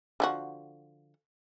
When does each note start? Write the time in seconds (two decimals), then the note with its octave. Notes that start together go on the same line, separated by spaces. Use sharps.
0.20 D3 F3 F#4